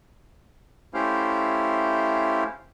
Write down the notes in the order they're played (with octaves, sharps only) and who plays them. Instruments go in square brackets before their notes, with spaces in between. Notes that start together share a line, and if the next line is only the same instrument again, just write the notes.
[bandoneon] A3 C#4 E4 G4 C5 F5